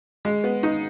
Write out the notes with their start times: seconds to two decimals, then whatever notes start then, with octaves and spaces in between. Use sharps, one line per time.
0.25 G#3
0.44 B3
0.63 D#4